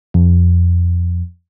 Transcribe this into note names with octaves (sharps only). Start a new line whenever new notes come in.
F2